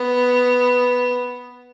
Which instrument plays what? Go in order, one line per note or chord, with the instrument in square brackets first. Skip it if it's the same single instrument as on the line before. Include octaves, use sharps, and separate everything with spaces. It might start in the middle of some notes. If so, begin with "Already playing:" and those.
Already playing: [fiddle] B3